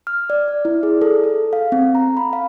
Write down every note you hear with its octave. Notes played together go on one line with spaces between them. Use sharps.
F6
D5
D5
E4
G#4
A4
A4
F5
C4
A#5
B5
F5